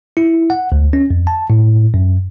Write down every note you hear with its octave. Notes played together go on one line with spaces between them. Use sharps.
E4
F#5
D2
C#4
F2
A5
A2
F#2